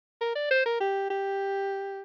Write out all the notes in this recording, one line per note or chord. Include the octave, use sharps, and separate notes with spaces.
A#4
D5
C5
A#4
G4
G4